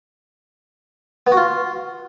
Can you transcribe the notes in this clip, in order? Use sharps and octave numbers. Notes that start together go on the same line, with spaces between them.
B3
F#4
F4